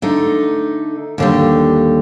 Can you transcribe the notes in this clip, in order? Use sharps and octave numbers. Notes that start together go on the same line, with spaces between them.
D3 A3 D#4
D#2 D3 G3